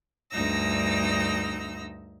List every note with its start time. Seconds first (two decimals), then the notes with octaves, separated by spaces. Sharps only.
0.30 D2 G2 D#4 E6 A#6